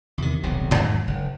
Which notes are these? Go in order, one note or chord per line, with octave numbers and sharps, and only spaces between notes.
E2 C3 D#3
D#1 B1 C3
E2 G#2 D#3 F#3
F#1